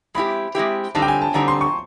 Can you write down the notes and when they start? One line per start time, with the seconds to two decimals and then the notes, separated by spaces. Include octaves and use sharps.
0.15 G#3 C4 E4 G4 B5
0.55 G#3 C4 E4 G4
0.95 D3 G3 C4 D#4 A5
1.02 G5
1.08 G#5
1.22 A5
1.34 D3 G3 C4 D#4 A#5
1.48 C6
1.61 C#6